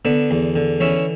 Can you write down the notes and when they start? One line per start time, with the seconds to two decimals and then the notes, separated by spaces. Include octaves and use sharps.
0.05 D3 B3 D4
0.31 E2
0.56 D3
0.80 E3 C#4 E4